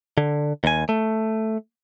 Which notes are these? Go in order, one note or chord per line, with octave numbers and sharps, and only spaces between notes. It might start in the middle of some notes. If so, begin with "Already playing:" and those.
D3
D#2 G#5
A3